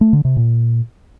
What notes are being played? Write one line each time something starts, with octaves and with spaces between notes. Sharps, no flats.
A3
D3
C3
A#2